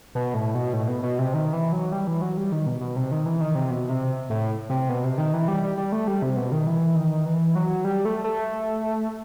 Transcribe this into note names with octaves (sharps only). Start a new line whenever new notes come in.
B2
A2
B2
A2
B2
B2
C3
D#3
E3
F#3
G3
E3
F#3
G3
D#3
B2
B2
C3
D#3
E3
D#3
C3
B2
C3
A2
C3
B2
C3
D#3
E3
G3
G3
G3
A3
G3
C3
B2
D#3
E3
D#3
E3
F#3
G3
A3
A3